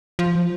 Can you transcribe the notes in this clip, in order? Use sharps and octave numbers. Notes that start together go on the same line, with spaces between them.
F3